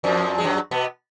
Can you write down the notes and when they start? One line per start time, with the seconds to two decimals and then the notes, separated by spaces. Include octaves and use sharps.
0.04 F2 F3
0.38 G#3
0.44 F#2 F#3
0.71 B2 B3